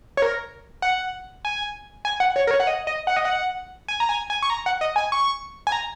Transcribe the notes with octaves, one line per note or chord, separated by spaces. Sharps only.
C#5
A#4
F#5
G#5
G#5
F#5
C#5
A#4
C#5
F#5
D#5
D#5
F#5
D#5
F#5
G#5
A#5
G#5
G#5
C#6
A#5
F#5
D#5
G#5
C#6
G#5
A#5